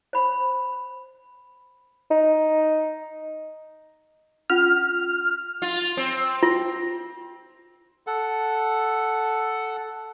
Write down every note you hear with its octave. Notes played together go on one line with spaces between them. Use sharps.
C5 B5
D#4
C#4 F4 F#5 F6
F4
C4
F4
A4 F#5